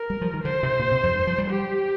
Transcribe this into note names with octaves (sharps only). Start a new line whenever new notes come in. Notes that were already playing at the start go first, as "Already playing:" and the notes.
Already playing: A#4
G3
F3
D#3
D3 C5
C3
A#2
C3
F2
G2
F3
G3
G4